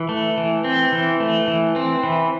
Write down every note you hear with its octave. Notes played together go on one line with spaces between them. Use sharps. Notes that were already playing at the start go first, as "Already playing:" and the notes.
Already playing: E3
A3
E3
C4
E3
A3
E3
C4
E3